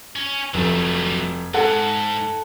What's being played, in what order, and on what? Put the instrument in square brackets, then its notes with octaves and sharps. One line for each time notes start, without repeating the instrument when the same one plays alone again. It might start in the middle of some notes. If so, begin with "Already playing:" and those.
[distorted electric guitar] C#4
[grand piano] F1 [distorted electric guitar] F#3 A3
[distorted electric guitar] G#2 [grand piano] A4 F#5 A5